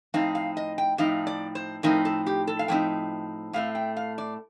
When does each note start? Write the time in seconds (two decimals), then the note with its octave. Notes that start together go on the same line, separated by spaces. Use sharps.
0.14 A2 F3 C4 D#4 F5
0.35 F5
0.57 D#5
0.78 G5
0.98 A2 F3 C4 D#4 F5
1.27 D5
1.55 C5
1.83 A2 F3 C4 D#4 A#4
2.05 A4
2.26 G4
2.47 A4
2.59 F5
2.68 A2 F3 C4 D#4 G5
3.53 A2 A3 C4 F5
3.75 G5
3.97 F5
4.18 D5